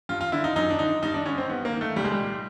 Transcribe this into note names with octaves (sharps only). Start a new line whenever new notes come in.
G2 F4
F4
D3 E4
D#4
F#2 D#4
D4
D3 D#4
G2 D#4
D4
D3 C#4
C4
G2 B3
A#3
D#3
A3
C2 G3
G#3
G3
A#2